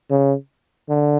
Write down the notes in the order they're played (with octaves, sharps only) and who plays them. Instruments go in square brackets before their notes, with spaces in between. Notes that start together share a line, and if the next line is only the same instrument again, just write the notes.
[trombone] C#3
D3